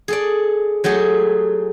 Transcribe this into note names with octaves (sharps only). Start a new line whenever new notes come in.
G#4 A4 D5
F#3 A3 G4 G#4